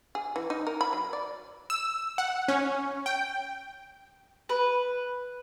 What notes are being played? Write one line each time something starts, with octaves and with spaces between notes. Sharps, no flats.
G#4
E3
D#4
A#4
B5
F#3
D5
E6
F#5
C#4
G5
B4